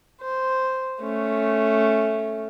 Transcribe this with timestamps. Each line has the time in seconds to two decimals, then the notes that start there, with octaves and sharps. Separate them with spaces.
0.21 C5
1.01 A3 C#4